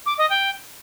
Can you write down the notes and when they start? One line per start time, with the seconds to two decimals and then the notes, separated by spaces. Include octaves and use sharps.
0.06 D6
0.18 D#5
0.30 G5